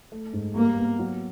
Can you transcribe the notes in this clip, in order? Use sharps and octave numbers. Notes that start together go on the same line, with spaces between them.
A3
G#2
G3 A#3
B3
F#3